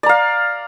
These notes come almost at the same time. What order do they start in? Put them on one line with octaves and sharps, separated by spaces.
D5 A#5 F5